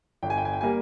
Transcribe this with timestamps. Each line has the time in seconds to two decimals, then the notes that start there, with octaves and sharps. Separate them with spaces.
0.23 G1 G5
0.30 G#5
0.38 G5
0.45 G#5
0.53 G5
0.61 G3 A#3 G#5